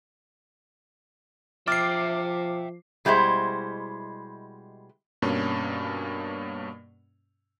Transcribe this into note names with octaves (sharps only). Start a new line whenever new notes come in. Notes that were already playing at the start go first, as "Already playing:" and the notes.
F3 E5 G5 D6 F6 A6 C7
B2 G3 G#3 E4 C5
G2 B2 A#3 C#4